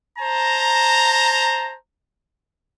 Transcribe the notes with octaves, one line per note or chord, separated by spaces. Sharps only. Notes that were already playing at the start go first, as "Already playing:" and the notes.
C5 A5 A#5